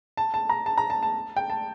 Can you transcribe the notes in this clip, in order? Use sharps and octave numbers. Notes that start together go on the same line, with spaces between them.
A5
A5
A#5
A5
A#5
A5
A5
G5
A5